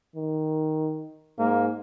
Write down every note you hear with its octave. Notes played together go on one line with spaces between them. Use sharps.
D#3
G#2 A#3